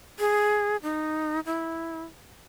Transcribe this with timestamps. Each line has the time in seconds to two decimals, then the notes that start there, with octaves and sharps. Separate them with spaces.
0.19 G#4
0.83 D#4
1.46 E4